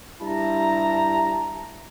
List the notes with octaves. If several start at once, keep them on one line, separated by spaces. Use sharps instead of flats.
G2 E4 A5 A#5